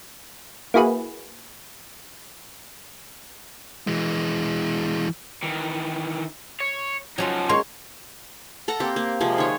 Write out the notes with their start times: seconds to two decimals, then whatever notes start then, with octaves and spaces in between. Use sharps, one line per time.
0.74 A#3 E4 F#4 G#4 B4
3.87 E3 G#3
5.43 D#3 E3
6.60 C#5
7.18 F3 F#3 C#4 D#4 F4
7.49 G#3 A#3 C#4 C6 C#6
8.68 A4 F#5 A#5
8.80 A#3 C4 G4
8.96 A#3
9.21 C3 F3 G#3
9.38 D#3 C#5